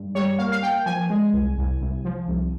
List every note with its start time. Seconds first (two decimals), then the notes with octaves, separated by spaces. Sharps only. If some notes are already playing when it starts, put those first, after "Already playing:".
Already playing: G2
0.15 G3 C#5
0.39 A#3 F5
0.52 F5
0.63 A#3 G5
0.86 F3 G#5
1.10 G#3
1.33 C2
1.58 C2
1.81 C2
2.05 F3
2.28 C2